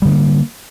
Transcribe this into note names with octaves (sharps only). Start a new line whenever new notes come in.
D3 G3 A#3 B3